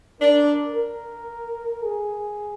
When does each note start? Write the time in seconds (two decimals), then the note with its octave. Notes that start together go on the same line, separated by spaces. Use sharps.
0.21 D4 A#4
0.76 A#4
1.85 G#4